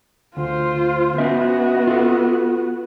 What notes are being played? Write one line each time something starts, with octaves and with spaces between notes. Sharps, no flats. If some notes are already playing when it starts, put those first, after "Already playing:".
D2 F4 C5
B3 C#4 F#4 D#5 E5
F4 A4